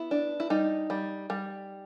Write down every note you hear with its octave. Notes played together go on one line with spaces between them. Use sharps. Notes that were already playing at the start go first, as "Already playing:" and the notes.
Already playing: B3 E4
D4
E4
G3 D#4
G3
G3